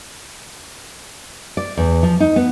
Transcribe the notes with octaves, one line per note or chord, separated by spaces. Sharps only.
D5
E2
F3
D#4
B3